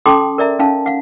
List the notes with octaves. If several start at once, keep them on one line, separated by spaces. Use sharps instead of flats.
C#4 A4 G5 A5 C6 D6
A#4 D5 E5 A#5
C#4 D#4 F5 A5
F5 F#5